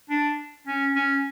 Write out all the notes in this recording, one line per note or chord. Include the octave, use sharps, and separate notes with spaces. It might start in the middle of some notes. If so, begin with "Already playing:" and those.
D4
C#4
C#4